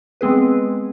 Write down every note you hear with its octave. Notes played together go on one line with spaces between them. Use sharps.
G#3 B3 C4 G#4 B4